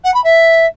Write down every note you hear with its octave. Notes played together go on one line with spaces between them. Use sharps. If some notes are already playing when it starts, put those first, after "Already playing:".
F#5
B5
E5